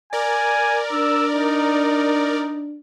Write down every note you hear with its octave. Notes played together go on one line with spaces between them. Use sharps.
A#4 D5 G#5
D4 E6
D#4